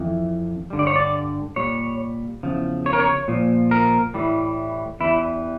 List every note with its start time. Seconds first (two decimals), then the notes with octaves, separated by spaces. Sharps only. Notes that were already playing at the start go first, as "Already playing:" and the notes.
Already playing: F2 E3
0.70 G2 D3 G3
0.79 D5
0.87 C#5
0.96 D5
1.56 A#2 G3 C#5
2.43 E2 C#3 F3
2.86 C#5
2.93 A#4
3.00 C#5
3.28 A#2 F3
3.71 A#4
4.14 A2 E3 G3
5.00 E2 E3 G3 E4